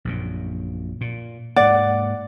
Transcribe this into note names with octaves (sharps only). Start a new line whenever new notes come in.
A#1 F#2 A#2
A#2
G#2 A#3 D5 F#5